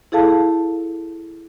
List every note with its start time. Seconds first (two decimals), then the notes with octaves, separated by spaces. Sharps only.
0.12 E4 G#4 A4 F5 A5